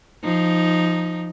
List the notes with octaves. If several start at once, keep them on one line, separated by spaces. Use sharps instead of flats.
F3 D#4